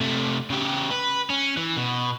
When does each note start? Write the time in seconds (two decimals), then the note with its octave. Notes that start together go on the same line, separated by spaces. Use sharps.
0.01 C3 A3
0.50 C#3 G4
0.91 B4
1.30 C#4
1.57 E3
1.77 B2